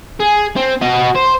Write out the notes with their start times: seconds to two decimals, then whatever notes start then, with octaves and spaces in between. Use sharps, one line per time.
0.20 G#4
0.56 C4
0.82 F#4 D#5
1.16 C5